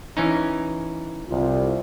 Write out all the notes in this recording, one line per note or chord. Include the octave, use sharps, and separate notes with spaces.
E3 C#4 D#4
C2 F4